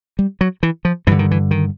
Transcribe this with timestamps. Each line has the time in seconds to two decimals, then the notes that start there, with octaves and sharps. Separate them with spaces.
0.19 G3
0.41 F#3
0.63 E3
0.85 F3
1.07 G2 D3 E3
1.19 D#3
1.31 E3
1.51 D#3